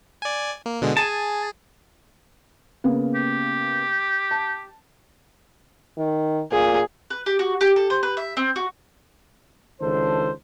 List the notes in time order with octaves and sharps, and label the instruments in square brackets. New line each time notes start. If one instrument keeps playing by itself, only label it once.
[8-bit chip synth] D5 G#5
A#3
B2 D3 G#3
[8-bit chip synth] G#4 [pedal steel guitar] G#5 A5
[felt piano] C#3 A#3 B3
[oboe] G4
[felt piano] A5
[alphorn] D#3
[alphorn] A#2 [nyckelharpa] G#4
[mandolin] B4
G4
F#4
G4
A4
C5
B4
E5
C4
F#4
[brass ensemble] C#2 D#3 D4 A4 C5